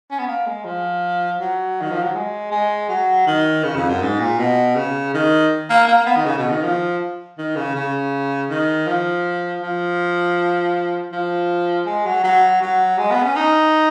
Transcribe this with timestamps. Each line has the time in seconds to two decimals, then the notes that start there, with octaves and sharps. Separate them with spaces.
0.11 C#4
0.19 B3
0.27 A#3
0.46 G#3
0.65 F3
1.40 F#3
1.81 D#3
1.91 F3
2.03 F#3
2.15 G#3
2.52 G#3
2.89 F#3
3.27 D#3
3.64 C#3
3.76 F2
3.89 F#2
4.02 G#2
4.20 A#2
4.39 B2
4.76 C#3
5.14 D#3
5.70 A#3
5.88 A#3
5.98 A#3
6.06 B3
6.16 D#3
6.26 C#3
6.38 B2
6.50 D#3
6.64 F3
7.38 D#3
7.56 C#3
7.76 C#3
8.50 D#3
8.87 F3
9.63 F3
11.12 F3
11.86 G#3
12.05 F#3
12.24 F#3
12.62 F#3
12.98 G#3
13.10 B3
13.23 C#4
13.36 D#4